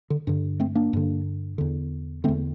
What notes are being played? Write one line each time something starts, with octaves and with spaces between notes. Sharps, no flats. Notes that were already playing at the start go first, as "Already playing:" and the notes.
D3
G2 D3
A3 C4
A#3 D4
G2 D3
E2 D3
E2 D3 A3 C4